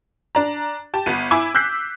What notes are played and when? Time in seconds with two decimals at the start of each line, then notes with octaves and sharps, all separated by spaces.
0.35 D4 A#5
0.94 G4 A5
1.06 G1 B3 D#7
1.31 E4 G#5 D6
1.55 E6 F#6 G6 B6 C7